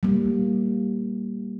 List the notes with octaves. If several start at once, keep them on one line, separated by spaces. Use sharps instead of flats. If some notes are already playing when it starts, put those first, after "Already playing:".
G3 A#3